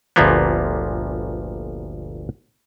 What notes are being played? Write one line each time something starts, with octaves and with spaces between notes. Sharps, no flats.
G1 D2 A#2 F3 A#3 B3